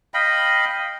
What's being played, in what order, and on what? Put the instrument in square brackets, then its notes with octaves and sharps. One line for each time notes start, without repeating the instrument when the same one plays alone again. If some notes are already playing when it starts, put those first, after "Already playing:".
[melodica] D#5 F5 G5 B5